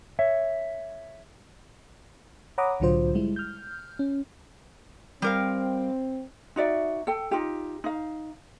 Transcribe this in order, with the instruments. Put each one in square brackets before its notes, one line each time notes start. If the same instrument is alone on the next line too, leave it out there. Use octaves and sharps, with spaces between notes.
[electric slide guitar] C#5 E5
[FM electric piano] C#5 F#5 A#5 B5 D6 D#6
C2 A2 D3 F#3 F4 C5
G3 G#3 E4
F6 G6
C#4
[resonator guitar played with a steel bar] G3 A#4 F5 [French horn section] C4
[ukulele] D#4 F#4 D5 E5
A4 G5
D#4 F4 G4
D#4 F5